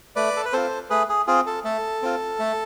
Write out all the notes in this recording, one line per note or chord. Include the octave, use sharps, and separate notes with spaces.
A3 B4 D5
A4
B4
C4 F4 A4 C5
A3 G#4 B4
G#4
C4 F4 G#4
A4
A3 A4
C4 F4
A3